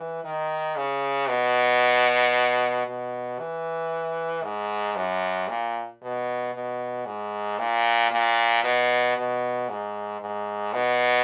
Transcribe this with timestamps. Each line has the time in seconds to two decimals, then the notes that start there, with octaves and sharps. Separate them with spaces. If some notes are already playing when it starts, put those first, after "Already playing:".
Already playing: E3
0.24 D#3
0.76 C#3
1.29 B2
2.86 B2
3.39 E3
4.44 G#2
4.96 F#2
5.49 A#2
6.02 B2
6.54 B2
7.06 G#2
7.59 A#2
8.11 A#2
8.64 B2
9.17 B2
9.69 G#2
10.21 G#2
10.73 B2